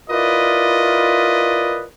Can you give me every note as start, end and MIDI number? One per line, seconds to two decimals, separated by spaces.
0.10 1.85 64
0.10 1.85 65
0.10 1.85 70
0.10 1.85 71
0.10 1.85 74
0.10 1.85 75